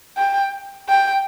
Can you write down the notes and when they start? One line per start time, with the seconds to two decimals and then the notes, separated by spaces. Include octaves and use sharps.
0.17 G5
0.89 G5